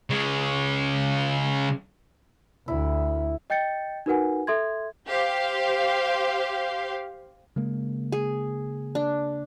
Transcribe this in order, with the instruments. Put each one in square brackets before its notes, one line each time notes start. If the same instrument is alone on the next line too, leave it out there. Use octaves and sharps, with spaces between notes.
[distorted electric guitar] C#3 G#3
[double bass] D2 [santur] E4
[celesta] D#5 G5 G6 A6 C#7
D#4 F#4 A#4 B4 F#5 G#5
A4 E5 C6 G#6
[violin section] G4 C5 F5
[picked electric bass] C#3 G#3 A#3
[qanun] G#4
D4